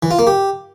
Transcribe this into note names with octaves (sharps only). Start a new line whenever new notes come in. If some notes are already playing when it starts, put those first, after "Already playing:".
E3
F4
A#3
G4